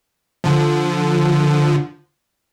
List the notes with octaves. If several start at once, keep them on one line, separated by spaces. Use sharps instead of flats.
D3 F3